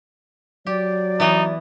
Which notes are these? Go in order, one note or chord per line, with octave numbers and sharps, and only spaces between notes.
F#3 G4 D5
E3 B3 D#4